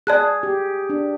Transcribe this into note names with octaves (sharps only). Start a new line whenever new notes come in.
G#4 D5 A5 F#6
G4
D4